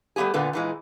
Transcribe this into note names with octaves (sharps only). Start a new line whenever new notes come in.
G3 A3 B3 G4 G#4
A#2 D3 A3 B3
A#2 E3 G#3